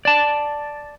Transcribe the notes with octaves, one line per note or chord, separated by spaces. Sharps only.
D5 A5